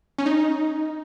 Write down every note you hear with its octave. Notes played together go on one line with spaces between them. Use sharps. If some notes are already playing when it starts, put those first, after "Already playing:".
C#4
D#4